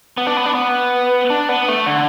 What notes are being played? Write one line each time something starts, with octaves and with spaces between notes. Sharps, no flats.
B3
D4
B3
D4
B3
D4
B3
A3
D3